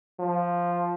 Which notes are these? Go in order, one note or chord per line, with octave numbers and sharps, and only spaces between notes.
F3